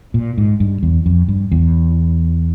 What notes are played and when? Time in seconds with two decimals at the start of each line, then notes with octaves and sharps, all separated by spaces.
0.14 A#2
0.38 G#2
0.60 G2
0.83 E2
1.06 F2
1.28 G2
1.52 E2